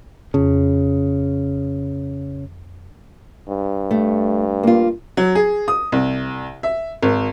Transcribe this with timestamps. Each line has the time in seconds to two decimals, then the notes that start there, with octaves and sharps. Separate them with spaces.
0.34 F2 C#3
3.49 G2
3.91 A3
4.63 A#3 F4
5.17 F#3
5.35 G#4
5.68 D#6
5.92 C2
6.63 E5
7.02 G#1